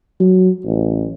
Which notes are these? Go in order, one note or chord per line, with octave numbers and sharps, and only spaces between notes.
F#3
A1